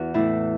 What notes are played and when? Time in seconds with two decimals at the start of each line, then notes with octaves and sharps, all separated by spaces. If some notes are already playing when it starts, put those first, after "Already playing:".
Already playing: E2 F#4
0.14 A2 E3 E4